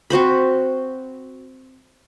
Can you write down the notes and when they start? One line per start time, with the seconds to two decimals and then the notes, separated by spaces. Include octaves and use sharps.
0.10 C4 F#4 C5 B5